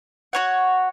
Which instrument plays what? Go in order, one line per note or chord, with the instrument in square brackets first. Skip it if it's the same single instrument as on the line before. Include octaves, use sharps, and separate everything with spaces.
[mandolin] F#4 A4 C#5 F#5